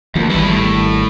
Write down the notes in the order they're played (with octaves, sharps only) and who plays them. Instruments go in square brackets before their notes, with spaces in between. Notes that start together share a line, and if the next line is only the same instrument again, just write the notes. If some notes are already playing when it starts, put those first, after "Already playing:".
[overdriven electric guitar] D2 [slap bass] F3 A#3
[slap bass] G#1 G3 [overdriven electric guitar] E2 E4
[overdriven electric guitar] A2